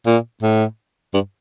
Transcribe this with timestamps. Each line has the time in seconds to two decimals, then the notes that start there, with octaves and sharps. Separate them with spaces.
0.06 A#2
0.42 A2
1.14 G2